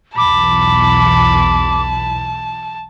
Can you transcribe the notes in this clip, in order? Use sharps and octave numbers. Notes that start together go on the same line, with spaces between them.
B1 E2 A5 B5 D6